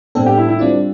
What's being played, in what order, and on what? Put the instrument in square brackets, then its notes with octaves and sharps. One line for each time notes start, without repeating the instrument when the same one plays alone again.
[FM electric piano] A2 G3 B3 D4 A4 [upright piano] C4
[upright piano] G4
E4
E4
[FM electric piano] G3 C4 F4 [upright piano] D4